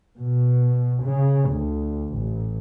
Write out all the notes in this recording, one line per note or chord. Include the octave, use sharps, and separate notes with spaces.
B2
C#3
D2
A1